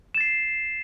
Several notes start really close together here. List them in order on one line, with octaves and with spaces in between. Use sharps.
E7 A6 C7